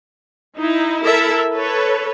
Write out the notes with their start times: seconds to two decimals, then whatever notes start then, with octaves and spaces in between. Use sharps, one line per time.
0.59 D#4 E4
1.04 E4 A4 A#4 E5
1.54 A4 B4 C#5